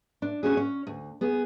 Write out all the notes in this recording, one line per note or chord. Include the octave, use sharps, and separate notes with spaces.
D4
C#4 F#4 G#4
C#4
D2
B3 G#4